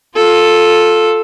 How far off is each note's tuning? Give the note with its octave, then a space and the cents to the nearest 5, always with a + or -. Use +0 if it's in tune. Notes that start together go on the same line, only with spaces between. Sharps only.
F4 +15 A4 +0